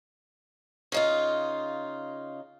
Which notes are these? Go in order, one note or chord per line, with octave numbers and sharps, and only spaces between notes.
C#3 D#4 F4